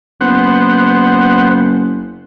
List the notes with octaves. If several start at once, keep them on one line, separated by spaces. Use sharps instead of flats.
F#1 B3 C5 F#5